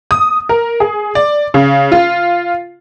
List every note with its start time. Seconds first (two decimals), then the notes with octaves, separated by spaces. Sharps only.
0.11 D#6
0.49 A#4
0.80 G#4
1.15 D5
1.54 C#3
1.92 F4